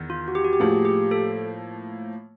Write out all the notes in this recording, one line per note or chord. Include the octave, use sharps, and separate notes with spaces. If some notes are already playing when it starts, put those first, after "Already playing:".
Already playing: E2 D#3
F4
F#4
G4
F#4
G4
A2 F3 A#3 G#4
G4
A4